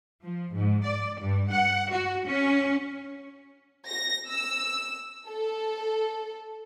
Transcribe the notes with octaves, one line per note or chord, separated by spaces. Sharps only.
F3
G#2
D5
G2
F#5
F#4
C#4
A#6
E6
A4